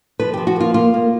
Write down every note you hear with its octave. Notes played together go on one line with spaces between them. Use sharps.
F3 B4
F3 G4
F#4
A#3 F4
A#3 F4
A#3